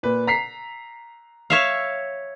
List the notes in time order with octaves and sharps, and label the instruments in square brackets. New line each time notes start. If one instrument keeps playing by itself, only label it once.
[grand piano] A#2 B4
A#5 B6 C7
[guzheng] C#5 E5 F5